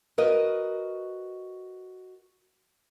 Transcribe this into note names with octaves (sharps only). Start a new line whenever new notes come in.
F#4 A#4 B4 D#5